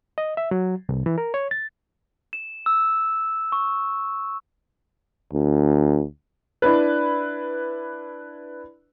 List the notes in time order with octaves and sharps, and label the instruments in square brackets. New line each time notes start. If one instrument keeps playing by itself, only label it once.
[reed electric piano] D#5
E5
F#3
C2
E3
A#4
C#5
A6
[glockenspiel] E7
E6
C#6
[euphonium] D2
[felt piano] D4 E4 B4